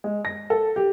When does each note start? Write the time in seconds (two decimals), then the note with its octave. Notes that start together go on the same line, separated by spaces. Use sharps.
0.04 G#3
0.25 A#6
0.50 A4
0.76 G4